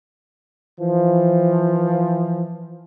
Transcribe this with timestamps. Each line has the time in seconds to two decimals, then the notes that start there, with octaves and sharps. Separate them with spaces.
0.79 E3 F3